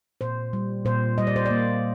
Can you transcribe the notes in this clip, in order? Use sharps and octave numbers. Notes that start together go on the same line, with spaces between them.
A#2 C5
G3
A#2 C5
G3 D#5
D5
C5
A#3 D5